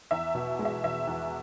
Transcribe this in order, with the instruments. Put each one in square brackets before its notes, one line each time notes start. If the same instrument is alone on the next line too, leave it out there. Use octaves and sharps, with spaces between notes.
[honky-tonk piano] E2 E5
B2
G#3
E5
E2 E5
E2